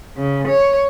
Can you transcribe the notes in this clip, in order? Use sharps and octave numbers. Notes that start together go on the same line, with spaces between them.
C#3
C#5